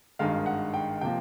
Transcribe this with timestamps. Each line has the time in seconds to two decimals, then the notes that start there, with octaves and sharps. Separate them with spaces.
0.19 G#1 G2 D#3 G#3 F5
0.46 F#5
0.74 G5
1.01 C3 F3 A#3 G5